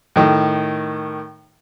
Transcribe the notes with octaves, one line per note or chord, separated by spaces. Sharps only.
A2 D#3